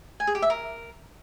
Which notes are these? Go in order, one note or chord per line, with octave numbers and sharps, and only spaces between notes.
G#5
G#4
G4
E5
A#4